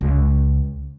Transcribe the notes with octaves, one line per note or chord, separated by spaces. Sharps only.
C#2